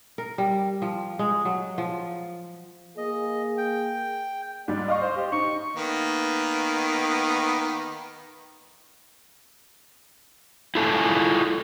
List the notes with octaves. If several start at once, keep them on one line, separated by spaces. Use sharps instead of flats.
A#4
G3
F3
G#3
F#3
F3
A#3 G#4 D#5
G5
G#2 G3 D5
D#5 F5 C#6
C5
G4
D#4 C#6
D#3 A#3 B3
E4 F4 A4 C5 G#5